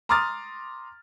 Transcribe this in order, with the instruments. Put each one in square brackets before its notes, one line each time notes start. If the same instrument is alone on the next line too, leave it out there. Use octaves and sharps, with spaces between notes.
[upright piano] A#5 C6 D6 D#6 F6 A6